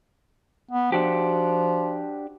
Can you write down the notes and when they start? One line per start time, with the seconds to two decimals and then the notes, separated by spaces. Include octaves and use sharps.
0.71 B3
0.92 F3 D4 F#4 G4